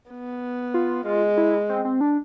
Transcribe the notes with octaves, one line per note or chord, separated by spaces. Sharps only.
B3
F4
G#3 F4
E4
C4
C4
D4